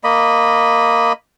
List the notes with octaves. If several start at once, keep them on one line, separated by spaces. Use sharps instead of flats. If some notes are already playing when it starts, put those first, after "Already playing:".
A#3 D#5 B5